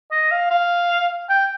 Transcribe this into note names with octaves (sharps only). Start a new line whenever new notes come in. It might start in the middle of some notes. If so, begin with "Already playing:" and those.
D#5
F5
F5
G5